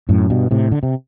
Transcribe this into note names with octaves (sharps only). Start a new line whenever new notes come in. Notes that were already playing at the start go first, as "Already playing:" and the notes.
F#2 A2
G2 B2
A2 C3
D3
C3